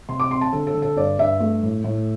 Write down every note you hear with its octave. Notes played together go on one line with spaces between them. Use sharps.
C3 C6
D6
C4 C6
A5
D3 A4
A4
D3
A4
G2 D5
G2 E5
A3
A2
A2